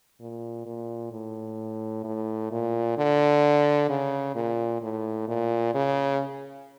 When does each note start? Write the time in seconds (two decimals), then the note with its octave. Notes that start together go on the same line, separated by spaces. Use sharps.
0.20 A#2
0.66 A#2
1.12 A2
2.04 A2
2.51 A#2
2.98 D3
3.89 C#3
4.35 A#2
4.82 A2
5.28 A#2
5.74 C#3